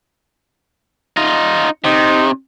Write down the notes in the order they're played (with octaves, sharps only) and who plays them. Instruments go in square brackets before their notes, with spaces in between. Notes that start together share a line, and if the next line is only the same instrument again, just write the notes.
[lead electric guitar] D#4 F4
[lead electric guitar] C3 [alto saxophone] D#4